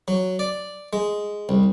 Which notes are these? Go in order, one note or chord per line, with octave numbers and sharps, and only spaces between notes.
F#3
D5
G#3
C2